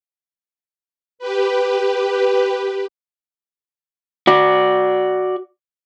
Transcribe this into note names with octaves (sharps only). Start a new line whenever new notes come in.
G4 B4
F#4 D5